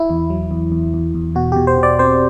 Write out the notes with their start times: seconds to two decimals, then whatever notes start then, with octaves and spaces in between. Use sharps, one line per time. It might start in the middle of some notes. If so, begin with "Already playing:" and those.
Already playing: E4
0.10 E2
0.30 F#3
0.51 E2
0.72 E2
0.94 E2
1.14 E2
1.35 B2 F#4
1.52 B2 G4
1.67 C5
1.77 B2
1.83 D5
1.99 C4 C5